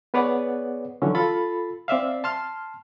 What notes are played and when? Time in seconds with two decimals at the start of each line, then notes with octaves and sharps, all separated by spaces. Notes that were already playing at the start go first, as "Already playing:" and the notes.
0.14 B3 G#4 B4 C#5 D5 F#5
1.02 D3 E3 F#3 C#4
1.15 F4 A4 B5 A6
1.88 C4 D5 E5 F5
2.24 A5 C6 F6